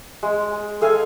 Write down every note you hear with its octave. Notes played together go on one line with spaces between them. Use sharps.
G#3
G#4 A4 F5 G#5